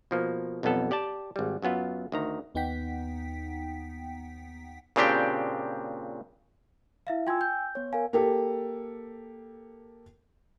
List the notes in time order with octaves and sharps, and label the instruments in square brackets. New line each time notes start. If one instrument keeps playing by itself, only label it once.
[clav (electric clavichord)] B2 F3 A#3
B1 F2 G3 B3 A4
G4 D5 G5 A5
G#1 G3
F#2 F#3 B3 F4
D2 D#3 A#5
[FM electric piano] D#2 B3 D#4 F#5 G5 B6
[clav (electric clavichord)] A#2 C#3 C4 D4 G4 G5
[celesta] E4 E5 F5
[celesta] F4 C6 G#6 [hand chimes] G5 G#5 E6
[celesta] G6
[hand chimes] B3 C#5
[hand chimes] A#4 G#5 [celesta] F5
[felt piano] A#3 G4 A4